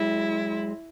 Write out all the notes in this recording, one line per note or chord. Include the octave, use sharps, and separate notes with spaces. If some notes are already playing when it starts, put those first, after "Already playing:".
Already playing: F#3 G#3 E4